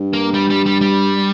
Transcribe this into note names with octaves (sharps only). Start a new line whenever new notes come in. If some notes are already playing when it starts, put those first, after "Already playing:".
Already playing: G2
A#3
G3
G3
G3
G3